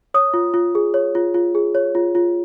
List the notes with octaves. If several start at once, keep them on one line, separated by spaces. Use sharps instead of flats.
C#5 D#6
F4
F4
G#4
C#5
F4
F4
G#4
C#5
F4
F4